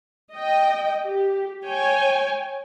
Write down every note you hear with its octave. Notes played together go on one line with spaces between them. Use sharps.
D#5 G5
G4
C#5 G5 G#5